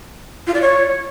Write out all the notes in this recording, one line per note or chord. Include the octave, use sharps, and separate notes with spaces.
F4
D5
C#5